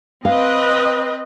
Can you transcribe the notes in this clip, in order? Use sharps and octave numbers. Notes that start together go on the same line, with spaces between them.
C4 B4 D#5 F5